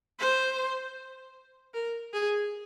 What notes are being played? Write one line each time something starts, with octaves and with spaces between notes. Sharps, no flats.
C5
A#4
G#4